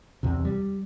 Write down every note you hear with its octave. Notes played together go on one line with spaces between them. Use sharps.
E2 C3
G3